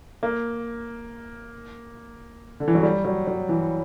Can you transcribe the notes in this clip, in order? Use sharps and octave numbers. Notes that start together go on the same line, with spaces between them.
A#3
D3
E3
F#3
G3
F#3
F#3
E3